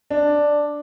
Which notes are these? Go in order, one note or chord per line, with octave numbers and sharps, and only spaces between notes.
D4